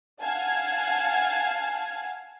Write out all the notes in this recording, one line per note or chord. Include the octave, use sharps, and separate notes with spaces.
F5 F#5 G#5 A5 G#6